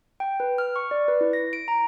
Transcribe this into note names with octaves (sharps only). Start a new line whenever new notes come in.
G5
B4
F6
C#6
D5
B4
E4
A#6
D7
A#5